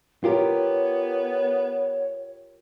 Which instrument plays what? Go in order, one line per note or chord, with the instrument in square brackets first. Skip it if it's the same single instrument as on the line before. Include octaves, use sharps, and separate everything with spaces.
[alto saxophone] B3 [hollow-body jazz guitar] F4 G4 A#4 [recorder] C#5